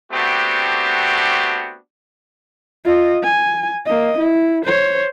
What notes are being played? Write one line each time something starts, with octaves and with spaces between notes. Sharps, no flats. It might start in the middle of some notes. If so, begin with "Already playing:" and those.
A3 B3 C4 D4 F#4 G4
F4 D#5
G#5
A#3 D#5
E4
C5 C#5